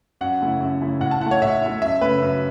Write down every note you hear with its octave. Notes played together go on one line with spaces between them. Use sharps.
F#2 F#5
C#3 A3 E4
F#2
C#3 A3 E4
A2 F#5
A5
E4 F#5
A3
C#5
A2 E5
A3 E4
F#2 E5
C#3 A3 B4
F#2